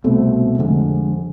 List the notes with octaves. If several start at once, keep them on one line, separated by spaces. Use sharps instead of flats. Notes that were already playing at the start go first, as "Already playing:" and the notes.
C2 B2 A3 C4
F2 D3 G#3